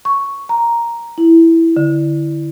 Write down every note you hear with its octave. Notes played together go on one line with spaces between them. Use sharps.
C#6
A#5
E4
D3